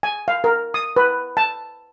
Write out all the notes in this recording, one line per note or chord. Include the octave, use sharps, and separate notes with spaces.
G#5
F5
A#4
D#6
B4
A5